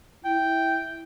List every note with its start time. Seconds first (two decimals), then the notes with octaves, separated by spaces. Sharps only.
0.25 E4 G5